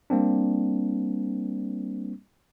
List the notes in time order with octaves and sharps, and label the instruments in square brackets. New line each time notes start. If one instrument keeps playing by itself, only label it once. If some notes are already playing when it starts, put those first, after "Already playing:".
[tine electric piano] G3 A#3 C4 D4